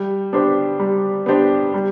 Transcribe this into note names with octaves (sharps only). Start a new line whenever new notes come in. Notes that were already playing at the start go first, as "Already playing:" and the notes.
Already playing: G3
B3 D4 G4 C5
G3
B3 D4 G4 C5
G3